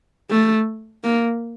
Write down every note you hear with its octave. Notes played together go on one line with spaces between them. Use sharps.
A3
A#3